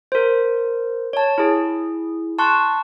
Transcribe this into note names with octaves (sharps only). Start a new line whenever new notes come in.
A#4 C5
C#5 A5
E4 G#4
A5 C6 C#6 F#6